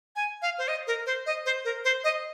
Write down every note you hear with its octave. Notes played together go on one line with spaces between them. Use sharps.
G#5
F5
C5
D#5
A#4
C5
D#5
C5
A#4
C5
D#5